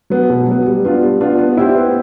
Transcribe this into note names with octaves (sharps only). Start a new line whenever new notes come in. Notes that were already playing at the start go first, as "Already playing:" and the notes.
F#3 B3
B2
F#3 B3
G3
B3 D4 F4
G3
B3 D4 F4
B3
E4 G4 C5
B3